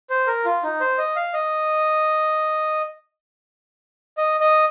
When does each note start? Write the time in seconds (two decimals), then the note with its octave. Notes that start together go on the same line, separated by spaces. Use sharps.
0.10 C5
0.27 A#4
0.45 F4
0.63 D#4
0.80 C5
0.98 D#5
1.16 F5
1.33 D#5
4.17 D#5
4.40 D#5